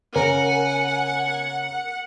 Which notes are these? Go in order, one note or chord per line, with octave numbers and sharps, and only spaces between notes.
C#3 C#4 A#4 F#5 G#5